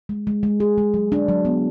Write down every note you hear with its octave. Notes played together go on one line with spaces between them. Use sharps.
G#3
G#3
G#3
G#4
G#3
F#3
D4
F#3
B3